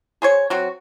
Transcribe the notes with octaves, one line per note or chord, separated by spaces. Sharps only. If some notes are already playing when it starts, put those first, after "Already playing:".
G#4 C5 C#5
F#3 C4 F#4